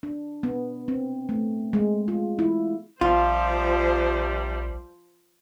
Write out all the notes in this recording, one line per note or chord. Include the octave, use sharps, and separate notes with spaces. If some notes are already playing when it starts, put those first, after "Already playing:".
D4
B3
C4
A3
G#3
F4
E4
A#1 C3 D#3 F3 G3 F4 C5